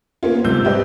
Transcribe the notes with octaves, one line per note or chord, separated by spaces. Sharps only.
A#3 B3 C#4 F4
G#2 C3 E6 G6
G4 B4 D5 D#5 G5